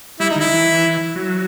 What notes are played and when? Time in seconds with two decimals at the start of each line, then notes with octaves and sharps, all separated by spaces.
0.20 G3 E4
0.30 D#4
0.36 D#3 E4
0.52 E3
1.16 F#3